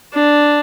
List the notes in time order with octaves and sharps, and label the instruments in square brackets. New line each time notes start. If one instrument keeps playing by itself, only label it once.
[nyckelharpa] D4